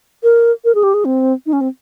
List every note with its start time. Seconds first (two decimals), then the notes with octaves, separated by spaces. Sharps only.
0.23 A#4
0.65 A#4
0.75 G#4
0.83 G4
0.94 G#4
1.05 C4
1.46 D#4
1.53 C#4
1.61 C4